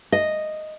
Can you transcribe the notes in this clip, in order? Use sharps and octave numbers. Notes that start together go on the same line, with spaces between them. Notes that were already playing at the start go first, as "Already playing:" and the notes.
D#5